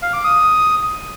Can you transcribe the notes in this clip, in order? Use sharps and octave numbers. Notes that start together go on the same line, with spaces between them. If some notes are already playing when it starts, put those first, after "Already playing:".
F5
D6
D#6